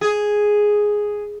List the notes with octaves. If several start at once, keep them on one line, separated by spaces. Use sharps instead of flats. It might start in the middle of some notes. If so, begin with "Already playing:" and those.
G#4